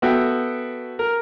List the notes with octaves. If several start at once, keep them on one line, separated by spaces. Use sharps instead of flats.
B3 F#4 A4 E5 G5
A#4